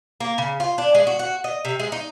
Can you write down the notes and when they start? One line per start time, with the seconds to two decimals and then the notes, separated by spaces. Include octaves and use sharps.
0.20 A#3
0.38 C#3
0.60 F4
0.78 D4
0.95 G#3
1.07 F#4
1.19 F#4
1.44 D#5
1.65 C3
1.79 G#3
1.92 D#4